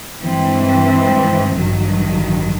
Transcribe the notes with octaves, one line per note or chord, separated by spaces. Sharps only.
G2 E3 G#3 C4
A1 G2 D#3 F#3